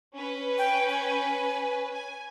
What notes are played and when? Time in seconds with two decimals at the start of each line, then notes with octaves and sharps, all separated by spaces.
0.15 C#4 B4
0.58 G5
0.90 G#5
1.94 G#5